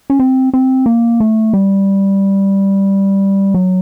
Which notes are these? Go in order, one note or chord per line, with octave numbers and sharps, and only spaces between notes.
C#4
C4
C4
A#3
A3
G3
F#3